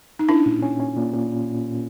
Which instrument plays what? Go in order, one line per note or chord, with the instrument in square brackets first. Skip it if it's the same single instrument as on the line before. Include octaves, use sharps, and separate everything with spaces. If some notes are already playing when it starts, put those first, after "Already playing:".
[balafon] D#4
[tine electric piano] C#4 [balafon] D4 E4
[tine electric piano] A#2
C#4
C#4
A#2
A#2